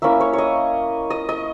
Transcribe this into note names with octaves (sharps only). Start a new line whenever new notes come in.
A#3 C#4 E4 E5
C#5
C#5 D#5
D#5
D#5